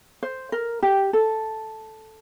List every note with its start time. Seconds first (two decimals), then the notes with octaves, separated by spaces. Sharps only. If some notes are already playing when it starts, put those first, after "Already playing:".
0.23 C5
0.52 A#4
0.83 G4
1.13 A4